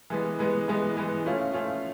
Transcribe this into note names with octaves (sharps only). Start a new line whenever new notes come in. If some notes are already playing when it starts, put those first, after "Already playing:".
E3 G#3 B3
E3 G#3 B3
E3 G#3 B3
E3 G#3 B3
F3 A3 C#4 F4
F3 A3 C#4 F4